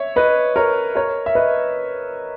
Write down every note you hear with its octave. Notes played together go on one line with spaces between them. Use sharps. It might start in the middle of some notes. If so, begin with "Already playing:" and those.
Already playing: C#5 E5
B4 D#5
A#4 C#5
A#4 C#5
E5
B4 D#5